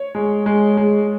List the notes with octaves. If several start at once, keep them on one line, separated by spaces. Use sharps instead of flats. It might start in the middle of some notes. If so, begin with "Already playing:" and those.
Already playing: C#5
G#3
G#3
G#3